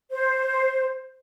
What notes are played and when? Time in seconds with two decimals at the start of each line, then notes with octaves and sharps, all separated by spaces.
0.12 C5